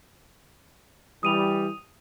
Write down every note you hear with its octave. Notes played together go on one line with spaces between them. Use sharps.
E3 G3 D#6 D#7 F7